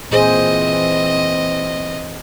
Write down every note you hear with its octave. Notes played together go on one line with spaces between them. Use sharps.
A#2 E3 C4 G#4 C5 D#5